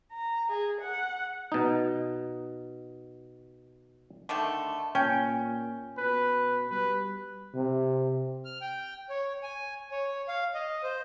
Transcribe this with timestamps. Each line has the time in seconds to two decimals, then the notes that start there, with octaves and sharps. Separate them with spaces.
0.12 A#5
0.51 G#4
0.79 F#5
1.52 B2 D#4
4.29 D3 D#3 A3
4.95 A#2 C#4 G5
5.98 B2 B4
6.70 G3 B4
7.55 C3
8.45 F6
8.61 G5
9.10 C#5
9.43 G#5
9.91 C#5
10.28 F5
10.54 D#5
10.83 C5